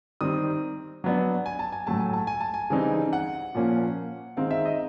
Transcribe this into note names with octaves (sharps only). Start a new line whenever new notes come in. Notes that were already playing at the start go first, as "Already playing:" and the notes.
D#3 G3 C4 D#4 D#6
F#3 B3 D4
G#5
A5
G#5
A2 F#3 A3 A5
G#5
A5
G#5
A5
G#5
C#3 E3 G3 C4 D#4
F#5
A#2 F3 A#3 C#4
D#3 G#3 C4 D#4 F5
E5
D#5